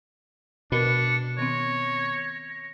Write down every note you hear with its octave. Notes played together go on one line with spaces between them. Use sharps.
B2 D4 A#4 B5 C#7
D#3 B3 C4 C#5 A#6
A#6